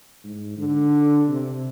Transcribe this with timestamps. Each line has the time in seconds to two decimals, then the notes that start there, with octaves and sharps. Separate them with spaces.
0.24 G#2
0.58 D3
1.28 C3